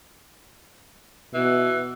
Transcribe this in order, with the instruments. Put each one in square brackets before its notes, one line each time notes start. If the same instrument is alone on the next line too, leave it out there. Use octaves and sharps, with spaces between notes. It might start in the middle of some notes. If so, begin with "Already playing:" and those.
[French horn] B2 [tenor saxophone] E3